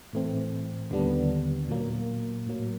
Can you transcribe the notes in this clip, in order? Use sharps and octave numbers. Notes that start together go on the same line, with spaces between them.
A2 E3 A3 C4
D#2 D3 G3 B3 D4
A#2 F#3 A#3
A2 F#3 A#3